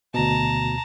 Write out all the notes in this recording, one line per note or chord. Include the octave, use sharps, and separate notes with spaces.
D2 B2 A5 A#5